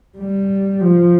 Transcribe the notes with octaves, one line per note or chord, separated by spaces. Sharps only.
G3
F3